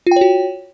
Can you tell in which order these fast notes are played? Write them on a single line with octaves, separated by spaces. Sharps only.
F4 G5 C#5 F#4